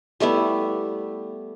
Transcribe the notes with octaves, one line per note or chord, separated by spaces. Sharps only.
G3 A3 B3 E4